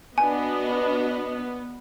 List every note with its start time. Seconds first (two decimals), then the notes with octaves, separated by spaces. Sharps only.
0.18 B3 D4 F#4 D#5 G#5